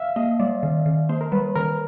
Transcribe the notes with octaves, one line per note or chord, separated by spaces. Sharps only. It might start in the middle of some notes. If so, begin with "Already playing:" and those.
Already playing: E5 F5
A#3 D#5
G3 D5
D#3
D#3
A#3 C5
A#4
G3 B4
D#3 A#4